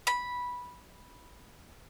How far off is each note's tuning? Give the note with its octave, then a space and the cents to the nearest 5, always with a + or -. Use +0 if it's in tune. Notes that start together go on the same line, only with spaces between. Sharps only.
B5 -10